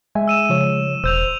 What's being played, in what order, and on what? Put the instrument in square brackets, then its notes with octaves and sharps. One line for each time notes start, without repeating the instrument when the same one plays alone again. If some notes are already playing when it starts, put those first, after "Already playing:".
[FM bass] G#3 [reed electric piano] E5 G#5
[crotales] E6 D#7 E7
[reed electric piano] C#3 F3 C#5
[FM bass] E1 [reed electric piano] C5 [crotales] E6 G6 F7